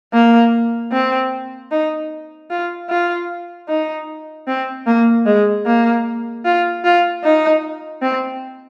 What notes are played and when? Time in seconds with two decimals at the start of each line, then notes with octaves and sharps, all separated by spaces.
0.13 A#3
0.92 C4
1.71 D#4
2.50 F4
2.89 F4
3.68 D#4
4.47 C4
4.86 A#3
5.26 G#3
5.66 A#3
6.45 F4
6.84 F4
7.24 D#4
8.02 C4